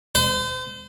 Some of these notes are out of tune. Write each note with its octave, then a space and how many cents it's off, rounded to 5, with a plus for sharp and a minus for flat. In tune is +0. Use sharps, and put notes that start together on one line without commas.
C5 -40